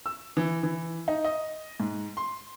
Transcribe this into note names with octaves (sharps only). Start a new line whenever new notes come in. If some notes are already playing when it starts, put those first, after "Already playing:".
E6
E3
E3
D#4
D#5
G#2
C6